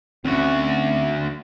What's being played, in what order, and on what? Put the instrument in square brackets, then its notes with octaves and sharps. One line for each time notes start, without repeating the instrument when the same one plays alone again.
[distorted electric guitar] D2 F#4 [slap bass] C4 C#4